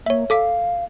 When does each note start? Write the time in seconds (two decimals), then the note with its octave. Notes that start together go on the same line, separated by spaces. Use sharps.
0.06 A#3 C#5 E5
0.30 A4 F5 D6 B6